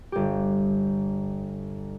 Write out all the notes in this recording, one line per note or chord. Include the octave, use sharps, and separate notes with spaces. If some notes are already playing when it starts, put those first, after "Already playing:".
G1 G4